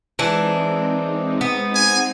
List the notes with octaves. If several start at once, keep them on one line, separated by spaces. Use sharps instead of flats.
E3 G#3 C4 D4 D#4
B3
G#5